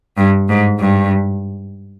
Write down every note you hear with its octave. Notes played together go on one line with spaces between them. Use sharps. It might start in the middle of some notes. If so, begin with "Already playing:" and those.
G2
G#2
G2